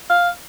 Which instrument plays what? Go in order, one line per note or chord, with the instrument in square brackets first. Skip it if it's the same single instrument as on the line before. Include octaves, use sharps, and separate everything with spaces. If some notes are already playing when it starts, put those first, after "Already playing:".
[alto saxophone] F5